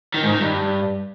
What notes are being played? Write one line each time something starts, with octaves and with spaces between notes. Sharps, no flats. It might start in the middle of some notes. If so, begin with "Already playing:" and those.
D#3
G#2
D#3
G2